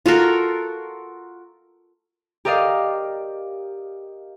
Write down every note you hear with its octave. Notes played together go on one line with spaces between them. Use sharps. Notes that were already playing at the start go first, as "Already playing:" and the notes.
F4 F#4 A4 A#4
G4 A#4 D5 D#5 F5